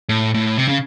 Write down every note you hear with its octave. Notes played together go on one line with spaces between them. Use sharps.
A2
A2
C3
C#3